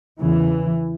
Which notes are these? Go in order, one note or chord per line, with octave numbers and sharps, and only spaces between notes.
E2 C#3 E3